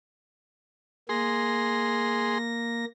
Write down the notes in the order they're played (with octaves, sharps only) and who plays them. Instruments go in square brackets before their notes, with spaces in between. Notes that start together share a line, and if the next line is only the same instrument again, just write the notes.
[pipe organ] A#3 A#6 [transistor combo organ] G#4 C6